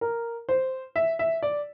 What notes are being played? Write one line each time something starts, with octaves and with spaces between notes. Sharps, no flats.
A#4
C5
E5
E5
D5